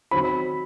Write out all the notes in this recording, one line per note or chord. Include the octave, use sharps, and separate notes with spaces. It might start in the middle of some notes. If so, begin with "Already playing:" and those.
D#3 F#3 C4 B5